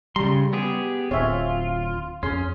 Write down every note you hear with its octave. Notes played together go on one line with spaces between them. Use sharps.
C#3 G3 A#5 C6
B3 G4 G#4
D1 C4 F4 C#5 E5 G#5
F2 C#4 G#4 C6